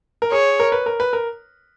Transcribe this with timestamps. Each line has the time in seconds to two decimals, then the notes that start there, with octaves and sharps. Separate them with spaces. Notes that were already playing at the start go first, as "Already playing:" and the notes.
0.22 A#4
0.32 G#4 C#5
0.60 A#4
0.72 B4
0.86 A#4
1.00 B4
1.13 A#4